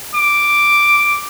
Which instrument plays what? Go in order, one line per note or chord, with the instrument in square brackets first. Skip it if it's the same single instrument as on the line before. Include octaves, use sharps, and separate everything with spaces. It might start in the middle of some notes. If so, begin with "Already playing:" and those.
[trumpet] D6